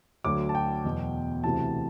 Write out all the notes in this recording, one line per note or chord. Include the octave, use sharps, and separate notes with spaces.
D2 D3 F#3 D6
A5
G5
E2 B2 F#3
D2 C3 E3 A5